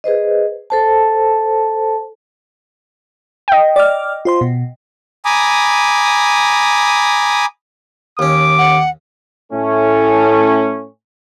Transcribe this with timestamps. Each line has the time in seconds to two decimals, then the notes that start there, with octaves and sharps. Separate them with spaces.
0.04 G#4 B4 C5 D#5
0.70 A4 C5 A5
3.48 D#5 G5
3.76 D5 D6 F6
4.25 F4 C5 C6
4.41 B2
5.25 G#5 A#5 B5 D6 D#6
8.19 D#2 C#4 D6
8.58 F#5
9.52 A2 A3 C#4